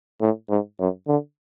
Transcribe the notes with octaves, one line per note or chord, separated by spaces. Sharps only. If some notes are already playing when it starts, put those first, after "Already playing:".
A2
G#2
F#2
D3